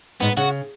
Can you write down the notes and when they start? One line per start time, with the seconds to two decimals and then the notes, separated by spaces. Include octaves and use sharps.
0.21 G#2 B3
0.37 C#3 F#4